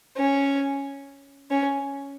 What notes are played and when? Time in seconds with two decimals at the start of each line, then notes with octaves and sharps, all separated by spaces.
0.17 C#4
1.51 C#4